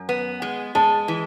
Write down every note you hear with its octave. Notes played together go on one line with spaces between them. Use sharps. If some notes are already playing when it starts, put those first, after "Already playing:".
Already playing: F#2
B3
G#3
G#3 A5
E3